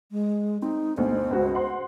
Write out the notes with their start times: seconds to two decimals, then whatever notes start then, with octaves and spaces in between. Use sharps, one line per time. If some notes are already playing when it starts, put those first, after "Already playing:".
0.12 G#3
0.62 C4 D#4
0.97 D2 B2 C5
1.31 C#2 F#4
1.55 F#5 C6